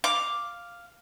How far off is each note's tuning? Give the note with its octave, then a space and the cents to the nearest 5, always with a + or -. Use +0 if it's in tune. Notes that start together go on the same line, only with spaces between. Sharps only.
F5 +0 D6 +0